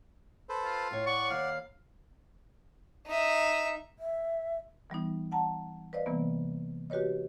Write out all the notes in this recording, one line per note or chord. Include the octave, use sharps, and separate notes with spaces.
A4 B4 C5
F4
A2 C#5
D5 F#5 C#6
D#2 F5
D#4 E5
E5
E3 G3 B3 D#4
F#5 A5 A#5
B4 C5 D5 D#5 F5
C3 E3 G3 A#3 B3
F#4 G4 B4 C#5 D#5